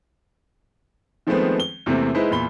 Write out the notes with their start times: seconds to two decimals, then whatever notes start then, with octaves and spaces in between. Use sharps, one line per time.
1.27 D#3 F3 G#3 A3 B3 C4
1.60 G7
1.86 E2 C3 A3 A#3 C4
2.15 G#3 D#4 E4 B4 C5
2.31 E2 A#2 B5 G7